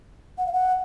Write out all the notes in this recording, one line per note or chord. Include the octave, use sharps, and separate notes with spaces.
F#5
F5
F#5